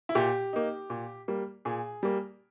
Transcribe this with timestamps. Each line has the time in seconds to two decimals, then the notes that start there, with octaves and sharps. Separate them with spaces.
0.09 E4
0.15 A#2 G4
0.53 A#3 D#4
0.90 A#2
1.28 G3 A#3
1.65 A#2 G#4
2.03 G3 A#3